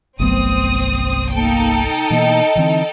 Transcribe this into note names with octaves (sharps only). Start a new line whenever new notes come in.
G1 C2 C3 F#3 A3 B3 C4 D#6
A#3 D#4 A4 G5
B2 E3 A#3 D#5
D3 E3 C4